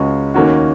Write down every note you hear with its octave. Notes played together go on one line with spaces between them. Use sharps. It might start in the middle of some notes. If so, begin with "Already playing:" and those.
Already playing: C#2 C#3 G#3 C#4 F#4
D#2 D#3 A#3 C#4 F#4